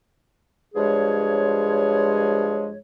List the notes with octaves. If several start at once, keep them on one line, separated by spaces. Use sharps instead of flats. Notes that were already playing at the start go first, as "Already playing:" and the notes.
G2 F3 G#3 G#4 C#5